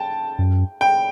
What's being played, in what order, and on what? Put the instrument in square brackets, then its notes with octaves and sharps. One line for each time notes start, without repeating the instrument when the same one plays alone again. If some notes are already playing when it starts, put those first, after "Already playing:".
Already playing: [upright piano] G5 A5
[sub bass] F#2
[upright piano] G5